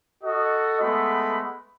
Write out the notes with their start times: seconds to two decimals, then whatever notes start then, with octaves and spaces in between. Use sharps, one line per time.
0.24 F#4 A4 D#5
0.81 G#3 A3 B3 B5